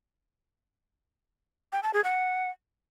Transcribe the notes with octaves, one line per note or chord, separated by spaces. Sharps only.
G5
A5
G#4
F#5